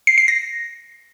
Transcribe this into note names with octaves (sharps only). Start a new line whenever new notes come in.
C7
C7
A#6